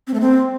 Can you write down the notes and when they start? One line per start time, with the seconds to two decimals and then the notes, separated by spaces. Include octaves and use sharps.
0.07 C4
0.14 A3
0.21 C4